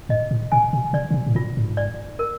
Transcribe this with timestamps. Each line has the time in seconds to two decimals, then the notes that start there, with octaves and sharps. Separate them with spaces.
0.09 G#2 D#5
0.31 A2
0.52 A#2 G#5
0.73 B2
0.93 C3 D5
1.11 C3
1.14 B2
1.26 A2
1.35 A#2 F4
1.57 G#2
1.77 D5
2.19 A#4